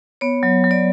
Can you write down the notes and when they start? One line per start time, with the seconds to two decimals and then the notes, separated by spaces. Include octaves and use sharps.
0.21 B3 C#5
0.43 F#3
0.64 F#3
0.71 D5